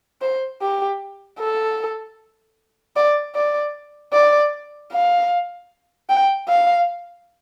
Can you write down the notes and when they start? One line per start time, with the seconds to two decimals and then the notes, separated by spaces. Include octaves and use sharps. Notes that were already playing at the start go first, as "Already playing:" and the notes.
0.21 C5
0.61 G4
1.40 A4
2.96 D5
3.35 D5
4.13 D5
4.92 F5
6.09 G5
6.48 F5